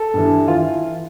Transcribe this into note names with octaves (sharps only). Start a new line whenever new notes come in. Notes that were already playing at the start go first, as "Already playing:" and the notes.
Already playing: A4
G2 E3
E3 F4